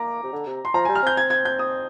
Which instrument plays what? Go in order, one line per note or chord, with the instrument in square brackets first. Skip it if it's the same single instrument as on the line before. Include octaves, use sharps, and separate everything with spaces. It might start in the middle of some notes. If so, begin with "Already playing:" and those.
Already playing: [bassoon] A#3 [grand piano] A#5 D6
[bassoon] C3
D3
C3
[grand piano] C6
[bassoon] F3 [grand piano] A#5
[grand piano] G#5
[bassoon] G3
[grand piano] F6
[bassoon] C4 [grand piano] G6
[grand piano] G#6
G#6
G6
D#6